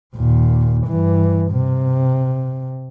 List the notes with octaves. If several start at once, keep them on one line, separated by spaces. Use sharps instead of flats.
D#2 A#2
G2 E3
C3